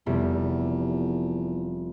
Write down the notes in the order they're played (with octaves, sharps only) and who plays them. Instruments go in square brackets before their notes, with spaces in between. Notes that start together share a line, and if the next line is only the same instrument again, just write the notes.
[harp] F1 G3 [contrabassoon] E2